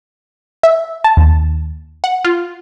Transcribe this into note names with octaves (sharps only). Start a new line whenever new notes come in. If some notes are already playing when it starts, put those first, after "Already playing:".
E5
A5
D#2
F#5
F4